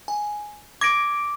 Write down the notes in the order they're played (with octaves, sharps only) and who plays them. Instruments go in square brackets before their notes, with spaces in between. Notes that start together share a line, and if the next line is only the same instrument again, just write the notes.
[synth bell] G#5
[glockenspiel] D6 [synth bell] G#6 A#6 D7